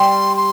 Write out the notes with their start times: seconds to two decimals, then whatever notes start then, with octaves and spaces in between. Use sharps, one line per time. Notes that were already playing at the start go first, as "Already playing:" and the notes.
Already playing: G3 C6
0.37 C6